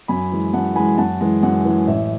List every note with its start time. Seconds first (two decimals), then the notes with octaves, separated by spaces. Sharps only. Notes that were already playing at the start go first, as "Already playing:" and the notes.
0.08 F#2 G#5 B5
0.32 E3 G#3
0.53 F#2 F#5 A5
0.76 E3 G#3 G#5 B5
0.98 F#2 F#5 A5
1.21 E3 G#3
1.43 F#2 F#5
1.65 E3 G#3
1.87 A1 E5